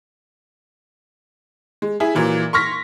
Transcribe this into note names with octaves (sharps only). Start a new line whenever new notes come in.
G#3
E4 G#4
A#2 E3 F#3
C6 C#6 F6 A#6 B6